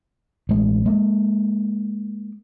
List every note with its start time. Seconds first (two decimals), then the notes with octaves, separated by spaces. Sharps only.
0.49 A1 G#3
0.86 G#3 A#3